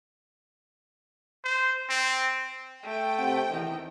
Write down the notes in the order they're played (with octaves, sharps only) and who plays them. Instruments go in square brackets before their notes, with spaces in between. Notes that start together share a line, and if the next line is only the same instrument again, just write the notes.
[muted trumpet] C5
C4
[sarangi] A3 [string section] G5
[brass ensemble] C3 C4 F#5
[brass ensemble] E2 E3 [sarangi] D#3